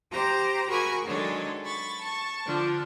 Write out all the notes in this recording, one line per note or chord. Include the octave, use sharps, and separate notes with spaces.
G4 C5 A#5
F#4 G#4 A#4 G#5 B5 C#6
D#3 F#3 G#3 D4 A4 C#5
B5 C#6 A6
A5 C#6
D3 F3 D4